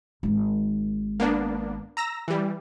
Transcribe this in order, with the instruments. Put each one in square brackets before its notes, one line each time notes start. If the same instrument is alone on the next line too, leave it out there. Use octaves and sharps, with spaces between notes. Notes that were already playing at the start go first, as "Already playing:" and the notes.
[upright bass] G#1 D#3
[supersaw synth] A#3 B3 D4
A#5 E6 A#6
E3 G3